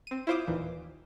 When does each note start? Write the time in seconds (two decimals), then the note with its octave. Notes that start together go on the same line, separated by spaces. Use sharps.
0.07 C4 D#7
0.27 E4 F4 C5 F5 D6 D#6
0.47 D#2 A#2 E3